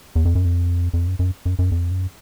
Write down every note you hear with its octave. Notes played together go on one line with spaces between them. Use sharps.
E2
F2
F#2
F2
F2
F#2
F#2
F#2
F#2
F2
F#2